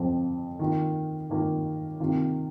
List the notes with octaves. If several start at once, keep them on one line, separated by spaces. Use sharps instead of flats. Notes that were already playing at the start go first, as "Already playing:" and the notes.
Already playing: F2 F3 C4
D#3 A#3 F4
D#3 A#3 F4
C3 D#3 A#3 F4